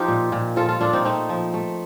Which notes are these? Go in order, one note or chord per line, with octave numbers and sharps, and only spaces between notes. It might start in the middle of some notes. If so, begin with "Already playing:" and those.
Already playing: F3 D#4 F4 G4
A#2
A#2
F3 F4 A4
F4 A4
A#2 D4 F4
C4 D#4
A3 C4 D#4
F3
A3